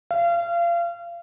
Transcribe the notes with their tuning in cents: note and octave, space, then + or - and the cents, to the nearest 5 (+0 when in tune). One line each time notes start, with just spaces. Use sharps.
F5 -30